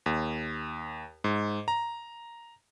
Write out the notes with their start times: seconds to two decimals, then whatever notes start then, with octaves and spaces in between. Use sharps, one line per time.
0.06 D#2
1.24 G#2
1.68 A#5